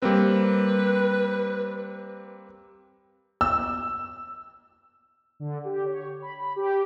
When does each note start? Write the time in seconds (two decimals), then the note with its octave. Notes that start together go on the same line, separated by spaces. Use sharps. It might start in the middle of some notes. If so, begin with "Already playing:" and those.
0.02 G3 A#3 C4 B4
3.41 E6
5.40 D3
5.65 G4
5.85 C#5
6.22 B5
6.39 B5
6.56 G4